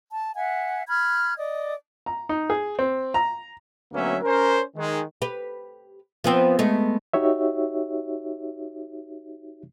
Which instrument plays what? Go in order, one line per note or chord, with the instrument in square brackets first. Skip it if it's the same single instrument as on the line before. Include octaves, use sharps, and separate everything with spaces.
[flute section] A5
E5 F#5 G#5
B5 F6 F#6 G#6
D5 D#5
[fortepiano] A#5
D#4
G#4
C4
A#5
[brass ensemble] D2 F#3 A#3 B3 C#4 E5
C#4 A#4 C5
D#3 G#3
[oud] G4 B4
F3 B3 C4
G#3 A3 B3
[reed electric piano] D#4 F#4 G4 C#5 E5